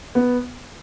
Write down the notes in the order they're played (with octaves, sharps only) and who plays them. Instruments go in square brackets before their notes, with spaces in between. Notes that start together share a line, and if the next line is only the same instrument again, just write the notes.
[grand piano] B3